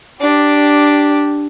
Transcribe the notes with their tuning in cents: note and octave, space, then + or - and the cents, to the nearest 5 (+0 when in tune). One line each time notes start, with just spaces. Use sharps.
D4 +0 G4 +0